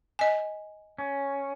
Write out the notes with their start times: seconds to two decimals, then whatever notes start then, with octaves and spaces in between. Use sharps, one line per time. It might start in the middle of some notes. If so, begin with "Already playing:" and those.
0.19 D#5 G#5
0.98 C#4